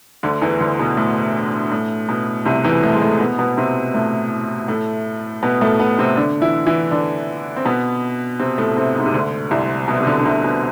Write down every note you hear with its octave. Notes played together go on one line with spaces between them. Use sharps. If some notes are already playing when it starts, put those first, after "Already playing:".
D2 D3
E2 E3
D2 D3
B2
A2
A2
B2
C2 C3
E2 E3
A2 A3
G#3
A2 A3
B2 B3
B2 B3
C3 C4
A2 A3
A2 A3
B2 B3
A2 A3
B2 B3
C3 C4
D3 D4
E3 E4
E3 E4
D3 D4
C4
B2 B3
C3 C4
A2 A3
C3 C4
G#2 G#3
C3
D2 D3
C2 C3
B2
C3
D2 D3
D3
C2 C3
B2